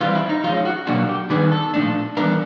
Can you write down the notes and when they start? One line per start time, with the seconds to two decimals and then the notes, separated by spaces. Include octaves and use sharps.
0.01 E3 G3 C4 F4
0.15 E4
0.29 D#4
0.44 F3 G#3 C#4 F4
0.65 F#4
0.87 B2 F#3 A#3 D4 F#4
1.09 G4
1.30 D#3 G3 B3 D4 G#4
1.52 A4
1.74 A#2 F3 A3 D4
2.17 E3 G3 B3 D4 A#4